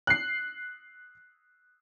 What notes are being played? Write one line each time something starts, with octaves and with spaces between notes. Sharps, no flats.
F#6 C7